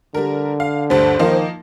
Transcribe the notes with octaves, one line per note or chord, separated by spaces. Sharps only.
D3 G3 A#4
F5
D2 G2 C5
D#3 F3 A#3 D#4